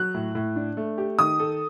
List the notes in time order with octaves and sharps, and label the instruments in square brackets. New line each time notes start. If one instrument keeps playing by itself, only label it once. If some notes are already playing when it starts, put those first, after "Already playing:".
Already playing: [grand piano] F#3 [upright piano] F#6
[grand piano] A2
A2
D4
A3
G4
[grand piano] D#3 [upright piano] D#6
[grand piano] A4